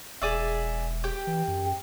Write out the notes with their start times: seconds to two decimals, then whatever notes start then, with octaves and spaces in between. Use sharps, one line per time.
0.22 E1 G#4 D5 E5
1.04 G4 G5
1.27 E3
1.48 F#2